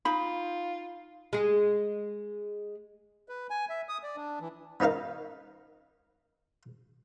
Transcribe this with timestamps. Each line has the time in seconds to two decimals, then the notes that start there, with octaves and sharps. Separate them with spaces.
0.05 D#4 F4 B5
1.33 G#3 G#4
3.29 B4
3.50 G#5
3.69 E5
3.89 D#6
4.03 D5
4.16 D4
4.40 E3
4.80 B3 C#4 D#4 A#4 F5